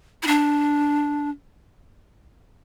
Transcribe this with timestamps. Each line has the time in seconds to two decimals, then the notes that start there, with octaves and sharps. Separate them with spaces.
0.23 E4
0.27 D4